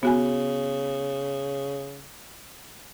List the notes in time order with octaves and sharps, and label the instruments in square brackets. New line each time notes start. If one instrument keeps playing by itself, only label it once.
[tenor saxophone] C#3 [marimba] B3 F#4 G#5